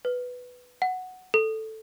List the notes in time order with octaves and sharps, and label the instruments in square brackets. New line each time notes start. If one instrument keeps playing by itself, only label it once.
[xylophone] B4
F#5
A4